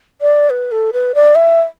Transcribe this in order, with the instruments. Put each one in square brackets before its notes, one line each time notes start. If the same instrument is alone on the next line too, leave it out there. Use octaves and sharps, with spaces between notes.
[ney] D5
B4
A4
B4
D5
E5